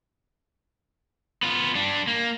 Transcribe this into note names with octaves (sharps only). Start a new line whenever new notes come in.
B3 F4
G3 D4
A#3